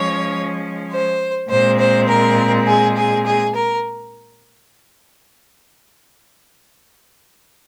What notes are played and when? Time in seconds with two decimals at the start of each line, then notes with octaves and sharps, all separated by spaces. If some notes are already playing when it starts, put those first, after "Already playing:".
Already playing: F3 G#3 C#4 C#5
0.91 C5
1.49 A#2 G#3 C4 C5
1.79 C5
2.08 A#4
2.67 G#4
2.97 G#4
3.26 G#4
3.55 A#4